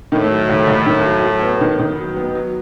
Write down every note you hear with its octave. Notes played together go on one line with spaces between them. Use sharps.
A2 D#3
F#3
D#2
D#2
D#3
F#3
F#3
B3
D#3
D#3
F#3
B3
F#3